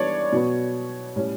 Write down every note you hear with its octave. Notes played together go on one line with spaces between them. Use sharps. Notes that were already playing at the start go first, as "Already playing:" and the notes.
Already playing: E3 G3 B3 D4 C#5 D5
B2 F#3 B3
A2 G3 C#4